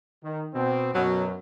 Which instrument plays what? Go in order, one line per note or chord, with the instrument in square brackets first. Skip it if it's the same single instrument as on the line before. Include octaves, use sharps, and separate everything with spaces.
[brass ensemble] D#3
B2 C4
[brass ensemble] F#2 [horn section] B2 F#3